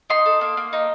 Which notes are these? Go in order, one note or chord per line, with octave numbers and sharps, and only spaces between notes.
D#4 C6
A4
A#3
A#3
D#4